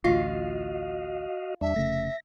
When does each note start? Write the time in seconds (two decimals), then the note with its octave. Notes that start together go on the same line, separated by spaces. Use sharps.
0.04 A1 D2 F4 F#4 D#5 F5
1.61 E2 G3 D4 E5
1.76 F1 C#3 A3 A#6